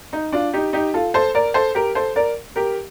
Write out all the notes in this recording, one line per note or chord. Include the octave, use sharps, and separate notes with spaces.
D#4
D4 F4
D#4 G4
D#4 G4
F4 A4
A4 C5
A#4 D5
A4 C5
G4 A#4
A4 C5
A#4 D5
G4 A#4